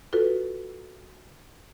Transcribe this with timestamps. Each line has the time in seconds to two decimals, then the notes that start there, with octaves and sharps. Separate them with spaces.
0.13 F4 F#4 A4 B4